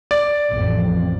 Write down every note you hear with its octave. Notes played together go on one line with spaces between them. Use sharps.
D5
A1 F2 E3